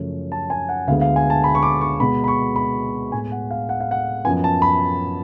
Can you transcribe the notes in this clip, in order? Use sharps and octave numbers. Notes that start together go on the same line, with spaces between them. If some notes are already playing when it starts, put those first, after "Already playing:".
Already playing: F#2 C#3 F3 A3 C#4
A5
G#5
F#5
D2 D3 G#3 B3 F5
F5
G#5
A5
B5
C#6
D6
C#6
B2 G#3 B3 B5
B5
C#6
B5
A2 G#3 B3 G#5
F#5
F5
F#5
F5
F#5
F#2 F3 B3 G#5
A5
B5